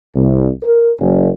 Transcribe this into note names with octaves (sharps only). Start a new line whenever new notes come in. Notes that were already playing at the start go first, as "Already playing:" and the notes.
C2
A#4
F#1